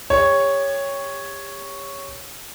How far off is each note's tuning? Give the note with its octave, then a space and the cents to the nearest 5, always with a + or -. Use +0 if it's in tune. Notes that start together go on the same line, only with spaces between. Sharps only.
G4 +35 C#5 +0